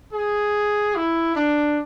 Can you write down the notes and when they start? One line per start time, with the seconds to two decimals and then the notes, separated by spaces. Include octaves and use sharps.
0.13 G#4
0.95 E4
1.36 D4